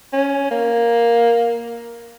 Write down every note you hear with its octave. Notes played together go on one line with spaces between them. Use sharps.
C#4
A#3